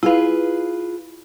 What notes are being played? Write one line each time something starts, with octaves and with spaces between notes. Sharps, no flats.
E4 F4 G#4 B4 F5